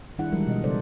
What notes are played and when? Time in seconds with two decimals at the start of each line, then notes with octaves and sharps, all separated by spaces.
0.18 D#3 G3 D4 E4 G#4 F#5
0.32 E3 F3 G3 G#3 A#4
0.47 B2 D#5
0.64 C#3 G3 D4 A4 C5 D5